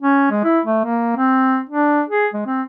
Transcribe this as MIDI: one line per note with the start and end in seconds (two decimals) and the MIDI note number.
0.02 0.28 61
0.31 0.43 56
0.44 0.60 64
0.65 0.81 57
0.85 1.13 58
1.17 1.60 60
1.70 2.03 62
2.10 2.27 68
2.34 2.45 56
2.47 2.62 60